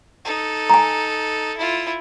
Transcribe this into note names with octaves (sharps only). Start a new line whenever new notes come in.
D#4 A4
G#5 A#5
E4 F4